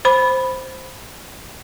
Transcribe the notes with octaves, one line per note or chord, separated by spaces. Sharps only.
C5 B5